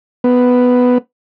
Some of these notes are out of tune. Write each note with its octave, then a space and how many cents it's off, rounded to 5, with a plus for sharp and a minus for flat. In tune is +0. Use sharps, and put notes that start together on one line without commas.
B3 +5